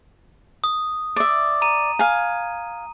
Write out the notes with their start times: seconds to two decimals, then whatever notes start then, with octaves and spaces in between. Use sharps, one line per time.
0.64 D#6
1.16 D5 E5
1.62 A#5 D#7
1.99 F5 G#5